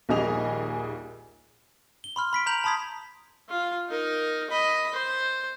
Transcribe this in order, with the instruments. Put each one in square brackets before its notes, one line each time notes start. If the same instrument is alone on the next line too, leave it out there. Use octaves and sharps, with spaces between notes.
[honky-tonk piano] A#1 D#2 G3 G#4 D#5 F7
[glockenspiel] G7
B5 C6 F6
B5 B6 D7
A#5 B5 G6 F7 F#7
A5 B5 C6 D#6 G#6 B6
[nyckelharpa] F4
D#4 A#4
D#5 B5
C5